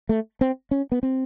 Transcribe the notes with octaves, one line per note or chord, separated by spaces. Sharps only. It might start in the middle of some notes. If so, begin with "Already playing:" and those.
A3
C4
C#4
B3
C4